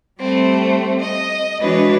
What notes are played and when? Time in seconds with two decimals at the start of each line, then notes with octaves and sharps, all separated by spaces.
0.20 G3 A3 C4
1.00 D#5
1.60 E3 G#3 D4 F#4 B4 C#5